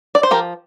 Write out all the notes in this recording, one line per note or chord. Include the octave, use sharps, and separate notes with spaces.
D5
C5
F3 G4 A#4